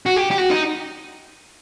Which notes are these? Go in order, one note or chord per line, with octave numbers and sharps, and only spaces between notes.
F#4
G4
G4
F#4
D#4